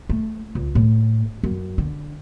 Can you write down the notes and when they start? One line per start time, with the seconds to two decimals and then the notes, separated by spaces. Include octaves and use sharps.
0.09 A3
0.55 C#2
0.75 A2
1.43 F#2
1.78 D3